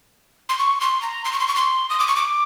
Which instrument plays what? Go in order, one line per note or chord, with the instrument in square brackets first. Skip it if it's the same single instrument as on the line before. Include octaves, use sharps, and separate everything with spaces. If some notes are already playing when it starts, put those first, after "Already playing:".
[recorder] C6
C#6
C6
A#5
C6
C#6
C6
C#6
C6
D#6
D6
C#6
D6